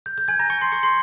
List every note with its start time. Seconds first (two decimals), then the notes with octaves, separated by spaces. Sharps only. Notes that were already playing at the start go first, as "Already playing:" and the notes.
0.06 G6
0.18 G6
0.28 G#5 G#6
0.39 A#5 A#6
0.50 C#6 C#7
0.61 C6 C7
0.72 C#6 C#7
0.83 C6 C7